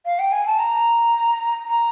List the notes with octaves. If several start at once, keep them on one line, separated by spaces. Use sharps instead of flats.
F5
G5
G#5
A5
A#5
A#5